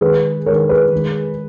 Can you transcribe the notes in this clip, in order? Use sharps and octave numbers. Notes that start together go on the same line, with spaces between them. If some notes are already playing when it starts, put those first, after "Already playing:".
D#3 G#3 G#4 B4
D#3 G#3 A#4 C#5
G#4 B4
D#3 G#3